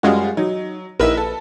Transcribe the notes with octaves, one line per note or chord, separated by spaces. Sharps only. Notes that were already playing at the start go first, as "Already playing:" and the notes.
F#2 G3 G#3 F4 F#4
F#3 D#4
A#1 D#4 E4 A#4 B4 E6
A4